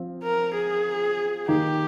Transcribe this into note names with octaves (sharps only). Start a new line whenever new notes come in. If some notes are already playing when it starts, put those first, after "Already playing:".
Already playing: F3 C4 F4
A#4
G#4
D#3 A#3 D#4 G4